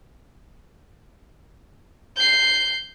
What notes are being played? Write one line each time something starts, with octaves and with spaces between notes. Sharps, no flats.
G6 C7